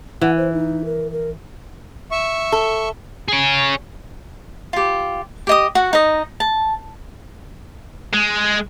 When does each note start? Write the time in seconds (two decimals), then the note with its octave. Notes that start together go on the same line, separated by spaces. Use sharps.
0.21 E3 F#5
0.37 C5
0.53 D#4
0.85 A#4
1.11 A#4
2.11 E5 C#6
2.52 A4
3.28 G#4 C#5
4.73 F4 G4
5.47 G4 D#5 D#6
5.75 F#4 F#5
5.93 D#4 D#5
6.40 A5
8.13 G#3